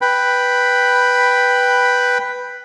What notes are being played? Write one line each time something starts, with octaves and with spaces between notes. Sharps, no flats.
B4 G5 B5